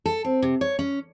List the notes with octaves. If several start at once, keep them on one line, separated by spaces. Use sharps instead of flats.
A4
C4
C3
C#5
C#4